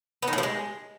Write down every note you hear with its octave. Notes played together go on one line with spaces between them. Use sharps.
B3
D#3
A2
F3
G#3